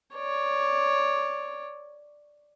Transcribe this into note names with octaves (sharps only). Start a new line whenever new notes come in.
C#5 D5